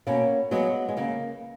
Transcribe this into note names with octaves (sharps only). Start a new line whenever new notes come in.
B2 A#3 C#4
F#3 G#3 B3
G#3
C#3 A#3